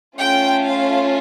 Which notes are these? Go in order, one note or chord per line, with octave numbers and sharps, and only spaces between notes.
A3 C#4 F4 G5
F5